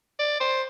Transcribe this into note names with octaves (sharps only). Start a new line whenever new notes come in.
D5
C5